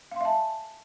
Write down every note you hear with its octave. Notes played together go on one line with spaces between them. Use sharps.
E5 F5 G#5 A5 C6